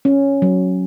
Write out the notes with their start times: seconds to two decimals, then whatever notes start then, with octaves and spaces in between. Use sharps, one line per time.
0.05 C#4
0.42 F#3